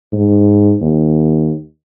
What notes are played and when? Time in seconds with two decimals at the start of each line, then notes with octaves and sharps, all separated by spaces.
0.13 G#2
0.81 D#2